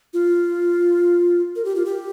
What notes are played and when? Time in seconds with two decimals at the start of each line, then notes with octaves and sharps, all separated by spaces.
0.14 F4
1.56 A#4
1.65 G4
1.76 F4
1.86 G4